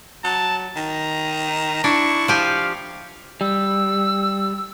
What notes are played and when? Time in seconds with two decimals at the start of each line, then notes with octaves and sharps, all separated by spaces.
0.24 F#3 A5
0.76 D#3 A#5
1.84 D4 E4 C#6
2.28 F3 G4 F5 G#5
3.41 G3 E6